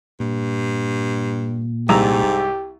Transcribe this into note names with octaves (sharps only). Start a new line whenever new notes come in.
G2 A#2
C2 G#2 G4 A#5 E6